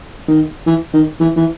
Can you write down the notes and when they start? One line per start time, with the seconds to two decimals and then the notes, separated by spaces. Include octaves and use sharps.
0.28 D#3
0.67 E3
0.93 D#3
1.20 E3
1.37 E3